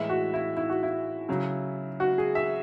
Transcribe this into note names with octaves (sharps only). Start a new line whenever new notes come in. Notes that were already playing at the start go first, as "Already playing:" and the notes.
Already playing: A2 E3 G#3 E5
F#4
E4
E4
F#4
E4
C#3 F#3
F#4
G#4
E5